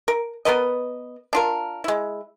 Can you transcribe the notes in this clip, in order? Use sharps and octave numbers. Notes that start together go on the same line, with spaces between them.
A#4
B3 A#4 B4 D#5
D4 F4 A#4
G#3 E4